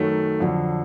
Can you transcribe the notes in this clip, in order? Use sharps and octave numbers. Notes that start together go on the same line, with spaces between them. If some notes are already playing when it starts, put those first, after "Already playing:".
Already playing: F#2 D#3 F#3 A3
F2 D3 F#3